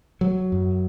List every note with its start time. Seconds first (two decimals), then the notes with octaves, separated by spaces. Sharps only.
0.21 F#3
0.52 F#2